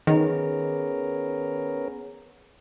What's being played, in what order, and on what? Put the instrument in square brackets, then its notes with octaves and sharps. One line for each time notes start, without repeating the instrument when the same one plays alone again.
[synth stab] D#3 [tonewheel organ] B3 C#4 A#4 [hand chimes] G#4